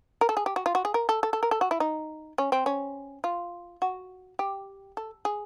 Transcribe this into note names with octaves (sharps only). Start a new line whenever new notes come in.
A#4
A4
G#4
G4
F#4
F4
F#4
G#4
A#4
A4
A4
A4
A#4
A4
F#4
E4
D#4
C#4
C4
C#4
F4
F#4
G4
A4
G#4